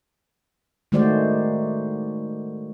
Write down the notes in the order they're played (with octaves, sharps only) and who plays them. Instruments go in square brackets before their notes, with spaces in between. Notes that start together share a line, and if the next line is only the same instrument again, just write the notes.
[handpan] D#3 G#3 A3 F#4 C5 D5